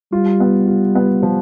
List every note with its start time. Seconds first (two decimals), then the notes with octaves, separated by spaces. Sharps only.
0.12 G3 F4
0.40 B3
0.67 F4
0.95 B3
1.23 F3